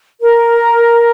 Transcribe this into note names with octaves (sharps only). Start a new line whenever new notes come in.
A#4